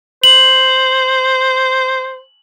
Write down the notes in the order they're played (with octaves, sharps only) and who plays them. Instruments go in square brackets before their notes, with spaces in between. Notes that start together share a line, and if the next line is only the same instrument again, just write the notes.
[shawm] C5 [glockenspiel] F#7